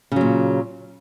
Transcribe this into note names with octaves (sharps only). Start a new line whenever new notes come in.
A#2 C#3 F#3